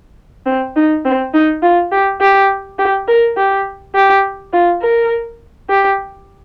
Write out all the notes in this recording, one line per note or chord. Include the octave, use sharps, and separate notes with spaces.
C4
D#4
C4
D#4
F4
G4
G4
G4
A#4
G4
G4
F4
A#4
G4